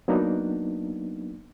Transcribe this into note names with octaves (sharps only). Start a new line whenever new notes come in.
F#3 A#3 B3 D4 D#4